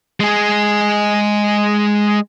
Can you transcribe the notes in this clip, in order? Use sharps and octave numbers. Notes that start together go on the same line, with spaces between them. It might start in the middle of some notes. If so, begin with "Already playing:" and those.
G#3 G#4